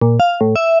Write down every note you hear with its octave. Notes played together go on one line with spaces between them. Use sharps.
A#2
F5
A2
E5